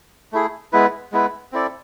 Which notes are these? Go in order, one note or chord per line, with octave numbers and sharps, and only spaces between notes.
A3 E4 G#4
G#3 B3 E4 B4
G#3 B3 E4 B4
C4 E4 A4 D5